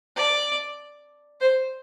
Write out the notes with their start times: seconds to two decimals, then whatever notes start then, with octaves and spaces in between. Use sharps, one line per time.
0.16 D5
1.41 C5